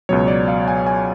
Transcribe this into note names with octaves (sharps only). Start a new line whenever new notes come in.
C#2 B2 F#3 C#5
D5
F5
G#5
G#5